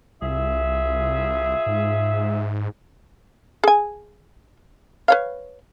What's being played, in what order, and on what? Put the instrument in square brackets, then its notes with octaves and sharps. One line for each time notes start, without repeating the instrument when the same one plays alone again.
[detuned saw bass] C2 [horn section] F4 G#4 E5
[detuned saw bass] G#2
[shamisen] G#4 G#5
B4 C#5 F5